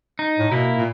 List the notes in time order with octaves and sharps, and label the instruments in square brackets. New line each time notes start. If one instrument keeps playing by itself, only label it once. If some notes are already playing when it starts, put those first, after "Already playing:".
[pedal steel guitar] D#4
[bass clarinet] A2
[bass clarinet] B2 [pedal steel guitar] A#3 E4
[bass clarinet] A#2